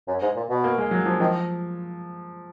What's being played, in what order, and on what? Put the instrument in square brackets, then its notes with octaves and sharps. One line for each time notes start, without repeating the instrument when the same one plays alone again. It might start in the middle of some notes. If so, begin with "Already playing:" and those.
[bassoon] F#2
G#2
A#2
B2
[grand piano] A#3
G#3
F#3
F3
[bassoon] D#3 [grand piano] F3